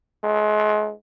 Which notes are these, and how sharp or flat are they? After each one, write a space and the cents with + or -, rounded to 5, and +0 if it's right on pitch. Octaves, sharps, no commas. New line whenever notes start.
G#3 +35